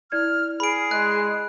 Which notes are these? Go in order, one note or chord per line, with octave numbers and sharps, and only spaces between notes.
E4 D5 F6 G#6
G#4 B5 D7
G#3 F#6